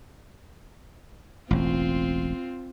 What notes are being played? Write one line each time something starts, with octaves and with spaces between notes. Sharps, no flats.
E1 A1 C4 F4